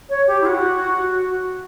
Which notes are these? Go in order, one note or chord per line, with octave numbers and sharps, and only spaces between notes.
C#5
G4
E4
F#4